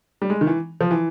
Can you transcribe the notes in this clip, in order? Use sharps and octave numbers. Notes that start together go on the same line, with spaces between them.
G3
G#3
D#3
E3
F3
E3